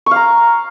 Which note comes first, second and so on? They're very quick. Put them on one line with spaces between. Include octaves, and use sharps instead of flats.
C#6 F5 A#5